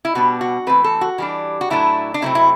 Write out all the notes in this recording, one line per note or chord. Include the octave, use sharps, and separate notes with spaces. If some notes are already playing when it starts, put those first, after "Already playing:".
E4
B2 G3 B3 D4 F#4
F#4
E3 A3 C4 B4
A4
F#4
E3 G3 D4
F#4
A2 F#3 A3 D4 E4
D4
C3 F#3 A3 C4 E4
E4